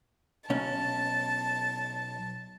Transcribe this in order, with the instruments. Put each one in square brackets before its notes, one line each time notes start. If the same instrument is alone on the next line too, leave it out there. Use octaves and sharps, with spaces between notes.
[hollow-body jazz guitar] B1 C#4 [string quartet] A5